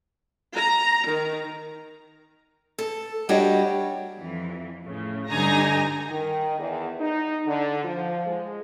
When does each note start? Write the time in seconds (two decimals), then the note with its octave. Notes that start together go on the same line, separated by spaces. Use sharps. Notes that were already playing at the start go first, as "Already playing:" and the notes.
0.55 A#5
1.08 D#3
2.78 A4
3.29 G3 D4 F#4 G4 C#5 D#5
4.19 F2 E3
4.84 A2 C#3
5.29 G2 D3 D#4 G#5 A#5 A#6
6.09 D#3
6.59 E2
7.00 D#4
7.46 D3
7.84 F3
8.27 G#3